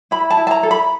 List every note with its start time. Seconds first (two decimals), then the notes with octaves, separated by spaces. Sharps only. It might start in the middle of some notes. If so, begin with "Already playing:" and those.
0.11 E4 B5
0.30 A5
0.37 E4
0.47 A5
0.51 A#5
0.63 A4
0.71 B5